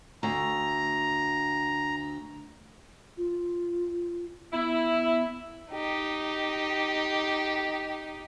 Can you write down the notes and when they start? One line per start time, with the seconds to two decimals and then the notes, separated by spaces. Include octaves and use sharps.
0.23 D2 A#5
3.17 F4
4.53 B3 E4
5.72 D#4 G4